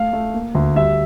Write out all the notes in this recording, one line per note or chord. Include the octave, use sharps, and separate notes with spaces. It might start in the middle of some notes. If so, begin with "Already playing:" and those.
Already playing: A3 F5
A3
A#3
D2
G3 E5